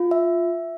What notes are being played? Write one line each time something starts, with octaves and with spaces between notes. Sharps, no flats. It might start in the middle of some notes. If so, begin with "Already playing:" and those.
Already playing: F4
E5